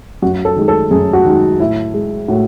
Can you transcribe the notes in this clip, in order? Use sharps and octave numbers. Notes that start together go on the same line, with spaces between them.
F#2 F#4
A4
D#3 G#3
A4
F#2 G#4
F#4
D#3 G#3
A2 E4
G#3
A2 F#4